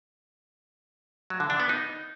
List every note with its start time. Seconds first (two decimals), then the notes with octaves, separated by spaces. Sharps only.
1.30 F#3
1.40 D3
1.50 D4
1.60 B3
1.69 D#4